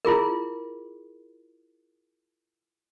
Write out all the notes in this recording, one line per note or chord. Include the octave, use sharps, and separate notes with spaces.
E4 F4 G#4 A#4